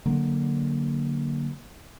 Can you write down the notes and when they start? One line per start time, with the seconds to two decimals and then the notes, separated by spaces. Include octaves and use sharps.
0.06 D3 F#3 A#3